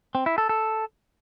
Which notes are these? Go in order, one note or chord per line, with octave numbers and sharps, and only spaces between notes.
C4
E4
A4
A4